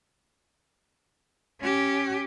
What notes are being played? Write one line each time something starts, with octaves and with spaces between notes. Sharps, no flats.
C#4 G4